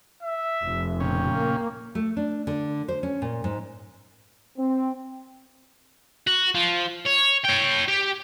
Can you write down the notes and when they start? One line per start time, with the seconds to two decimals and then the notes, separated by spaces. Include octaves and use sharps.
0.23 E5
0.63 F1
1.00 A#2 C#3 C#4 G5
1.32 A#3
1.95 A3
2.17 D4
2.47 D3
2.88 C5
3.03 C#4
3.22 A#2
3.44 G#2
4.57 C4
6.27 F#4
6.55 F3
7.05 C#5
7.44 C#5 G5
7.88 G4